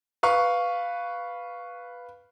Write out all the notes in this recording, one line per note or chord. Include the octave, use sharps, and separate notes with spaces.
B4 F5 C#6